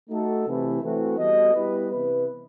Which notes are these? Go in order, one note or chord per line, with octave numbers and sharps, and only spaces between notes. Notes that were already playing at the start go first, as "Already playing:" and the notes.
A3 D#4 F#4 A4
C3 E3 A3 E4
E3 A3 C4 F#4
G3 B3 F#4 A4 D#5
G3 B3 E4 G4 B4
C3 E3 B3 E4 B4